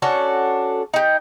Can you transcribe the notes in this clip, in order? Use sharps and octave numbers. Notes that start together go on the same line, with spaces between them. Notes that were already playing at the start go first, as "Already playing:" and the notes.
C#4 D4 F#4 A4
D#4 G4